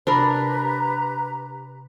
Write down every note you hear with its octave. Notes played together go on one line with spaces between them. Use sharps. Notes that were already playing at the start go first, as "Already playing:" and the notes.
C3 D4 G4 A#4 B4 A#5 B5